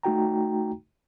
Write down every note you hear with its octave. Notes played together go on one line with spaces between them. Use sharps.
A3 D#4 F#4 G5 A#5